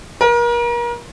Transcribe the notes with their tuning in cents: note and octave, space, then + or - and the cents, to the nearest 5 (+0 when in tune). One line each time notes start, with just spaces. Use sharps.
A#4 +35